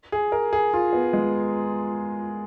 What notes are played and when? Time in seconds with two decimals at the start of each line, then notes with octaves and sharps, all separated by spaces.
0.12 G#4
0.32 A#4
0.53 G#4
0.73 F4
0.93 B3
1.13 G#3